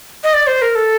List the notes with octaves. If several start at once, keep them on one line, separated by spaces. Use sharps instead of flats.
D#5
D5
C5
A#4
A4